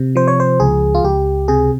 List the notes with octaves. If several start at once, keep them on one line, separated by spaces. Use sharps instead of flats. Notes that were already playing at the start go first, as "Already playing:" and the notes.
Already playing: C3
F3 C5
C#5
C5
C#2 G#4
F4
C#2 G4
C3 G#4